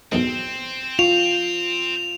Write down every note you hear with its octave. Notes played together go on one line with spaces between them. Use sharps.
B1 E2 G#2 C4
F4 C#6 F7